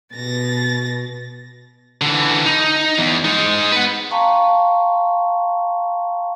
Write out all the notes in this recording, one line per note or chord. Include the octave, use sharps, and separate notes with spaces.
B2 A6 A#6
D3 E3
D#4
E2
G#3 D#4
B4 F#5
F5 G5 A5 A#5 C6 C#6